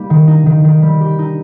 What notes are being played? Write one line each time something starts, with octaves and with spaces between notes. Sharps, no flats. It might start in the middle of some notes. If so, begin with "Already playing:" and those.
Already playing: G3 A#3 D#4
D#3
D#4
D#3
D#3
G3
G4
D#4